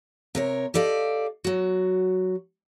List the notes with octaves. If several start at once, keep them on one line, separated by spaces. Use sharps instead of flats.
C3 A#4 C#5
G4 A4 D5 D#5 F5
F#3 F#4